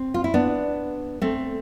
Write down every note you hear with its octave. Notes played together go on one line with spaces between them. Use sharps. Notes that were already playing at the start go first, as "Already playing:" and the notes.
Already playing: C4
F4
E4
B3 D4
A3 C4